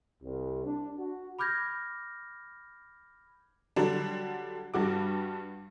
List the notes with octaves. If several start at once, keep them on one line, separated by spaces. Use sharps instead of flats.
C2
D4
F#4
B5 D6 F6 G6 G#6 A#6
D3 F#3 G3 D4
G2 G3 F#4 D6